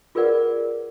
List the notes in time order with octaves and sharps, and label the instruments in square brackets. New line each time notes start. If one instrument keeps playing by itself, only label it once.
[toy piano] F4 G#4 A#4 B4 D5 F#5